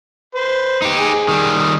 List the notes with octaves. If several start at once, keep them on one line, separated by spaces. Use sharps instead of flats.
B4 C5
D#4 G4
G#4
D#3 G3